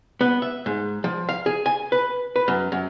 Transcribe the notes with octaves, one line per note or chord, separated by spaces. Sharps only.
B3
E5
G#2
F3
F5
G#4
G#5
B4
B4
F#2
F#2